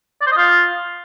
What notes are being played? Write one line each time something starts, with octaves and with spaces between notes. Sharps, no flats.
D5
C5
D#5
F4